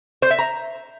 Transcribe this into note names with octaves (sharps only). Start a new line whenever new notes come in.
C5
E5
A#5